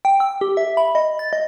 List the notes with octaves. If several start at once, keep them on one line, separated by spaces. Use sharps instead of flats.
G5
E6
G4
E5
B5
D#5
A6
D#5